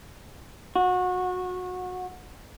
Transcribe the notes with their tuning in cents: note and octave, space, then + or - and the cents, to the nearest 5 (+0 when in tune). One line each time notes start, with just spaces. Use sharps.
F#4 -25